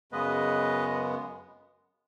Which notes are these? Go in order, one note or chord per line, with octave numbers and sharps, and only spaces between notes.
F#2 C#3 G#3 B3 B4 D#5